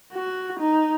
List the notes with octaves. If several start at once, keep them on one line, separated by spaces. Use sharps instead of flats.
F#4
D#4